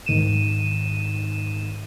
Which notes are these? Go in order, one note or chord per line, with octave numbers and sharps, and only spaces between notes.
G#2 D#3 D#7 E7